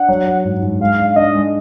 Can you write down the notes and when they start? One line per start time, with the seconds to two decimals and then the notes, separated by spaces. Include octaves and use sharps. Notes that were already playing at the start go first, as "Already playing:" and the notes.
Already playing: D4 F#5
0.08 F#3
0.27 F#3
0.44 G#2
0.62 G#2
0.80 G#3 F5
0.99 D4
1.10 F5
1.16 D4 D#5
1.35 G#3